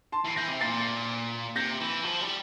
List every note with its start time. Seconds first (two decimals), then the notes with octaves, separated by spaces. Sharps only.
0.12 A5 C6
0.25 E3 C7
0.36 E3 G6 A#6
0.48 C3
0.60 A#2 A6 C7
1.56 C3 G6 A#6
1.80 E3
2.04 F3
2.20 G3